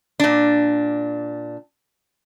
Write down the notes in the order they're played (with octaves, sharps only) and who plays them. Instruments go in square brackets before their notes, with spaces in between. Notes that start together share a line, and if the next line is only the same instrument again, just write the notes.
[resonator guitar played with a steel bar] A#2 D4